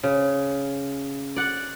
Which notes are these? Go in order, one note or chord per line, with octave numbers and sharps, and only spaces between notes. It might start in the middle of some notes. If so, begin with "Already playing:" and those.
C#3
D5 F#5